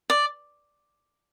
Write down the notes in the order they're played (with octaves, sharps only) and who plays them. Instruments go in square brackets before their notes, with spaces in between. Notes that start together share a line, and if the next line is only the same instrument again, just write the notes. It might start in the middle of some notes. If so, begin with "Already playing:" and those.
[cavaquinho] D5